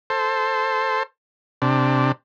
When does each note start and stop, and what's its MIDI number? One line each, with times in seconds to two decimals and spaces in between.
0.10 1.03 69
0.10 1.03 72
1.62 2.12 48
1.62 2.12 62